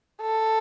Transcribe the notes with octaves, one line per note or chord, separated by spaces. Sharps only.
A4